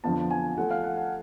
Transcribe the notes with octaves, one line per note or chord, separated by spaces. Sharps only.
F2 D3 F3 B3 A5
G#5
F3 A3 F4 F#5
F5
F#5
F#5